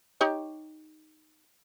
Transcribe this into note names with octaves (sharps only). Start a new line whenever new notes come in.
D#4 G4 C#5